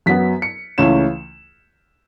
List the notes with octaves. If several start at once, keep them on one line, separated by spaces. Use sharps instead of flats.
F#2 F#3 B3 B6
C#7
C#2 C#3 E3 A3 C#4 E7